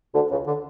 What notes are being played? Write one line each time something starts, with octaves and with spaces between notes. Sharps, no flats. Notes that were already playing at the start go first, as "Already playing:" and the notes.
D2 D3
C#2 C#3
D3